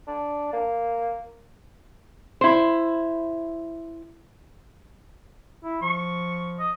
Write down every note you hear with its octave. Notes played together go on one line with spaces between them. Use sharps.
D4
A#3
E4 C5
E4
F3 C#6
D#5